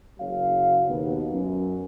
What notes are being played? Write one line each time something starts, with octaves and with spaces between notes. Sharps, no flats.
F#1 F#3 F5
D#2 B2 B3 D#4
F#2